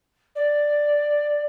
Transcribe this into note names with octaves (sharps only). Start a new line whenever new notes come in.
D5